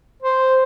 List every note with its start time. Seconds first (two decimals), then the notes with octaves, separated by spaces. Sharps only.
0.22 C5